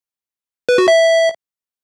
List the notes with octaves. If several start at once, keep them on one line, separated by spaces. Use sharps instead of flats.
B4
F#4
E5